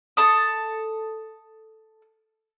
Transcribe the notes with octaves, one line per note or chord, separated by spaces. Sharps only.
A4 A5 D#6